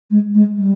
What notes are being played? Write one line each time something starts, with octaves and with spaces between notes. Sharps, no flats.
G#3
G#3
G3